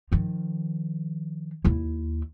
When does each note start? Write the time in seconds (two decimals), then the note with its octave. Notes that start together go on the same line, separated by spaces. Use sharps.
0.12 D#3 F3
1.64 D#2 E4